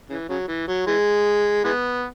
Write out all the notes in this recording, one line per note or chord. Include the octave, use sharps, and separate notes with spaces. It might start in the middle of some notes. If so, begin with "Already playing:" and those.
C#3 E3
C#3 F#3
E3
F#3
E3 G#3
E3 G#3 B3